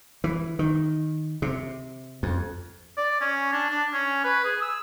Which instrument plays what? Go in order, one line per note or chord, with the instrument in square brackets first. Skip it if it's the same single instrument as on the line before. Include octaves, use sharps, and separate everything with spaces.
[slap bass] E3
D#3
C3
F2
[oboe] D5
C#4
D4
D4
C#4
B4
G#4
E6